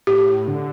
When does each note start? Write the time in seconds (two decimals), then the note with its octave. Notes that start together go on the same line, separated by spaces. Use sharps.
0.07 A2 G4
0.48 D3